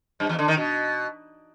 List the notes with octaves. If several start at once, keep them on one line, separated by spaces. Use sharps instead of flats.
G2
E2
D3
D#3
B2